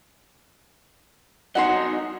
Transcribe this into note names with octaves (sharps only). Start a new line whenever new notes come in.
D#4 F#4 D#5 F#5 G#5 C6